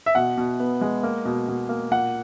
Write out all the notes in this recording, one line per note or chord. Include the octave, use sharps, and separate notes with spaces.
E5
B2 F#5
B2
B3
G#3
A#3
B2
B2
A#3
A#2 F#5